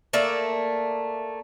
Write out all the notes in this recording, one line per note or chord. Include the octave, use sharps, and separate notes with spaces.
A3 A#3 D5 E5